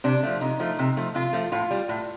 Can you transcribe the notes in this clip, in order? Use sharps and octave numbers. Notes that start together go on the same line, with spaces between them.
C3 D4
F3 A3
C3 D#4
F3 A3
C3
F3 A3
C3 F4
F3 A3
A2 F4
G3
A2